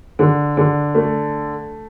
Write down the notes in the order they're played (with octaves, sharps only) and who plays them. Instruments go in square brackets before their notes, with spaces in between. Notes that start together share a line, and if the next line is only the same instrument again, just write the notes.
[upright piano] D3
D3
A3